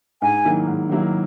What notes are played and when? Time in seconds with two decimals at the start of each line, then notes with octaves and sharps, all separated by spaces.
0.22 G#2 G#5
0.45 D#3 F#3 A#3 E4
0.67 G#2
0.89 D#3 F#3 A#3 E4